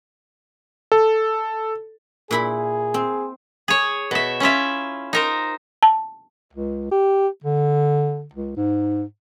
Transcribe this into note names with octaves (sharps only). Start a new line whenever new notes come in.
A4
A#2 E4 G#4 B5
C4
G#4 C#5
B2 E5
C#4 E4 F4 E5
D#4 A#4 C5
A5
C#2
G4
D3
C#2
G#2